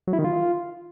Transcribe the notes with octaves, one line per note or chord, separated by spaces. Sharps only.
F#3
E4
D#3
F4